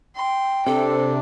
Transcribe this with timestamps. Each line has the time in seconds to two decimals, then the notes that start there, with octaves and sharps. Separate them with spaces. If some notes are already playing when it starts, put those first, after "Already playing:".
0.16 G5 C6
0.66 C3 D4 A4